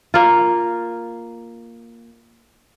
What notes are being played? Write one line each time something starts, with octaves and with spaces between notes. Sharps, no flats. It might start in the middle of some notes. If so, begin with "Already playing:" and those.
A#3 F4